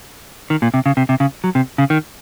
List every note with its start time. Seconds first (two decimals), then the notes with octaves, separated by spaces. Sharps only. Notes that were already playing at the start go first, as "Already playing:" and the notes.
0.50 D#3
0.62 A#2
0.74 C3
0.86 C#3
0.97 C3
1.09 C3
1.20 C#3
1.44 F#3
1.55 C3
1.78 C#3
1.90 D#3